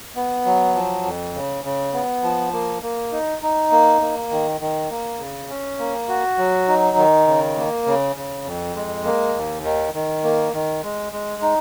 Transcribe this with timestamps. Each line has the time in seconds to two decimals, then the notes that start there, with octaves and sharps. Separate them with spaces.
0.15 B3
0.45 F#3
0.75 F3
1.05 F2
1.34 C#3
1.65 C#3
1.93 B3
2.23 F3
2.53 A#3
2.83 A#3
3.12 D#4
3.42 D#4
3.72 A#3
4.01 A#3
4.31 D#3
4.61 D#3
4.90 A#3
5.19 C#3
5.50 C#4
5.79 A#3
6.08 F#4
6.38 F#3
6.68 D#4
6.98 D#3
7.27 C#3
7.57 A#3
7.86 C#3
8.16 C#3
8.46 F2
8.75 G#3
9.05 A#3
9.35 D#2
9.64 D#3
9.94 D#3
10.24 A#3
10.53 D#3
10.83 G#3
11.13 G#3
11.42 D#4